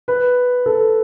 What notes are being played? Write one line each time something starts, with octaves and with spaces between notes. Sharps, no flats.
B4
A4